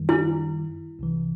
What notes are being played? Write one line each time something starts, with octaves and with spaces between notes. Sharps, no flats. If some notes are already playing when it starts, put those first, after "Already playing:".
Already playing: F#2 D#3 G3
E4
C2 C3 E3